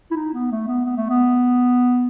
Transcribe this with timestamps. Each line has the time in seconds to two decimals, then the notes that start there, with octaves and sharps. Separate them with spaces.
0.11 E4
0.16 D#4
0.34 B3
0.51 A3
0.68 B3
0.85 B3
0.97 A3
1.10 B3